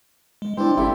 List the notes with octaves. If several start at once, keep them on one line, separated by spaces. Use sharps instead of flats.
G#3
G#3 C4 D4 E4 D5
G1 C#4 E4 G4 A4 E5